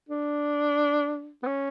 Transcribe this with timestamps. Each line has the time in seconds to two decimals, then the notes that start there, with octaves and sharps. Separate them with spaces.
0.09 D4
1.43 B3
1.47 C#4